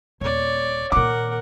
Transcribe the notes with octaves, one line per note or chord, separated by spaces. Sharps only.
D#1 C#5 D5
A#2 D#3 A#4 F#5 D6